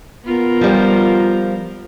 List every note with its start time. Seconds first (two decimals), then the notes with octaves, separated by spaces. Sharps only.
0.24 B3 F4 A#4
0.61 F3 G3